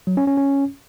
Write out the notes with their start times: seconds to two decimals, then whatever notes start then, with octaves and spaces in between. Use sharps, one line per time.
0.07 F#3
0.17 C#4
0.27 C#4
0.37 C#4